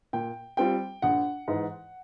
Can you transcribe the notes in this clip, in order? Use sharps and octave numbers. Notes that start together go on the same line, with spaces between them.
A#2 G5
G3 C4 F4 G5
A#1 F#5
G#2 E3